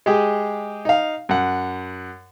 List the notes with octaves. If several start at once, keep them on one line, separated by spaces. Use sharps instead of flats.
G#3 G4 G#4
D#4 F5
F#2 F#5